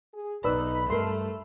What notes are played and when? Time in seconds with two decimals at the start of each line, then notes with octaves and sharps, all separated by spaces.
0.13 G#4
0.44 B1 B2 D#4 B4 D5 B5 E6
0.90 G2 A3 A4 A#4 C6